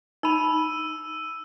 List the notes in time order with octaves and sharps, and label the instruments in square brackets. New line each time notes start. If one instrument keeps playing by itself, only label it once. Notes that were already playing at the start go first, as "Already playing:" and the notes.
[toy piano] D#4 B5 [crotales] E6 D#7